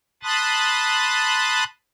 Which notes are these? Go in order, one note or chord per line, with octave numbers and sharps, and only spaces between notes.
A5 B5 C6 D#6 F#6 A6